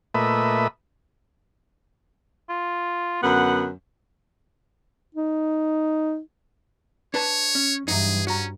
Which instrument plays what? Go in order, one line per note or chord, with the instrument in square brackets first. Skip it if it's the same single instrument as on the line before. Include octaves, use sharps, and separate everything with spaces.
[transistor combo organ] A#2 A3 B4 D#5 E5 B5
[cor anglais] F4
[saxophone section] F#2 D3 B3 [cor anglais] F#5
[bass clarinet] D#4
[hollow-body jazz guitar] D4 B4 A5 [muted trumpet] C#5
[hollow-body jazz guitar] C#4
[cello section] G2 [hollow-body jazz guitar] E3 F#3 D#4 [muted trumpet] G#4
[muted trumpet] C#4 [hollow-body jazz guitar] F#4 A#5